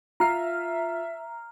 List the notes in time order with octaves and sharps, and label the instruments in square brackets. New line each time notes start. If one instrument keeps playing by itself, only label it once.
[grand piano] F4 C7 [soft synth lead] E5 [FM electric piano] A#5 F6